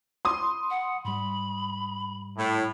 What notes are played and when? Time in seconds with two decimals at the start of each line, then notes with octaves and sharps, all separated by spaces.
0.25 B5 C6 D#6
0.70 F#5
1.05 G#2 G3 B5
2.37 A2